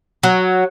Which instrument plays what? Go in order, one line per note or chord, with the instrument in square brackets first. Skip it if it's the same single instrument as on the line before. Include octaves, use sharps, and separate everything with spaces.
[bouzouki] F#3